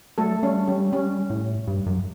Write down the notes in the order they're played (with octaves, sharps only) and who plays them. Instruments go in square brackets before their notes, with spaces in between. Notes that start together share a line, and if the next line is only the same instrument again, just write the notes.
[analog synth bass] F#3 [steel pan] A3 A4
[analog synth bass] G3 [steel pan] C#4
[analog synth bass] G3 [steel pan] C#4
[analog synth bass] G3 [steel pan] C#4
[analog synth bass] A2
G2
F#2